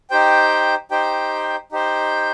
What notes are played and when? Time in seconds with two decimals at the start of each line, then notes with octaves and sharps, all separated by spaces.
0.10 D#4 G4 C5 G5
0.91 D#4 G4 C5 G5
1.72 D#4 G4 C5 G5